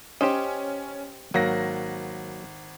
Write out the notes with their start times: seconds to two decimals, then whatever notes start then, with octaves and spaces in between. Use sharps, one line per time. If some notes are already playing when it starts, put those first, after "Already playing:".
0.21 C#4 G4 C5 D#5
1.34 G#1 F#3 A#3 A#6